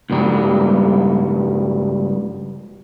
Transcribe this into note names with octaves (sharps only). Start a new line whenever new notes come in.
C#2 G2 G3